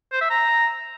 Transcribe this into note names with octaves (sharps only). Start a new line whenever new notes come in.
C5
E5
A#5